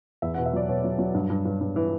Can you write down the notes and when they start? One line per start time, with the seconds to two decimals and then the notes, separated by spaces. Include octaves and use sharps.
0.22 E2 E5
0.34 F#5
0.38 B2
0.46 E5
0.53 F#3 D5
0.69 B2 C#5
0.84 F#3
0.99 F#3
1.14 G2
1.30 G2
1.45 G2
1.61 G2
1.76 E3